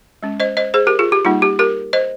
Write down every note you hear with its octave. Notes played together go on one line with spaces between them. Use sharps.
G#3 C#4
C5 D#5
C5 D#5
G#4 C5
G4 A#4
F4 G#4
G4
G3 A#3 D#4 F4
G4
G4 A#4
C5 D#5